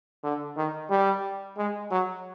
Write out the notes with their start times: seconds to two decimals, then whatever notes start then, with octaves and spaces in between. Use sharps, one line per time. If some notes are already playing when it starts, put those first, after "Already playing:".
0.24 D3
0.57 D#3
0.90 G3
1.58 G#3
1.91 F#3